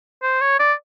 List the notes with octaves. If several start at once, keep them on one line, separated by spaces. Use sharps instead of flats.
C5
C#5
D5